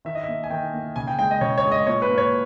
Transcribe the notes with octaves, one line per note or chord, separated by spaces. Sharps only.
D#3 E5
D#5
A#3 E5
G#5
D#3 G5
A#3
C#3 G#5
G5
G#3 G5
D#5
C#3 C#5
C#5
G#3
D#5
A#2 C#5
B4
A#3
C#5